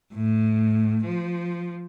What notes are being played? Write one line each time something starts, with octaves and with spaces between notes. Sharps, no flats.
A2
F3